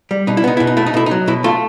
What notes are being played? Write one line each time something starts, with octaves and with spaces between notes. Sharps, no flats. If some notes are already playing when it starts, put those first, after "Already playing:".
G3
B2 D#4
E4
B3 D#4
B2 E4
D#4
A3 E4
D#4
B2 E4
D#4
F#3
B2 E4
A3 F4